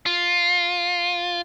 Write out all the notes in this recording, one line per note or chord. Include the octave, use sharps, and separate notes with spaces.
F4